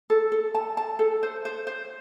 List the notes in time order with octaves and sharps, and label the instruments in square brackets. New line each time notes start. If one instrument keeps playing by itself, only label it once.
[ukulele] A4
A4
A5
A5
A4
C5
C5
C5